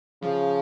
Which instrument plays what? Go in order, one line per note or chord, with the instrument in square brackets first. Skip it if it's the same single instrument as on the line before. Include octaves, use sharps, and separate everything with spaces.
[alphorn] C#3 [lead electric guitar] F3